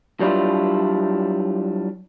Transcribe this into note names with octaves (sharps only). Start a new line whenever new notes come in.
F#3 G3 D4 E4 F4